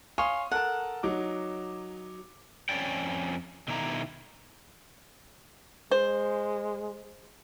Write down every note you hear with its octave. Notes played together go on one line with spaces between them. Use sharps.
C#5 F5 G#5 C6 D#6
A4 A#4 F#5 A5
F#3 D#4 D6
F2 C#4 C#5 D5 G5
B2 D3 D#3 E4 A#5
G#3 C5